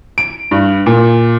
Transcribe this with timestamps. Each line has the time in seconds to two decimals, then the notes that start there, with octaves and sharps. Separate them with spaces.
0.18 D7
0.51 G2
0.86 A#2